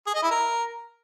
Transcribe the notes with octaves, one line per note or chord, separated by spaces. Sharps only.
G#4
D#5
E4
A#4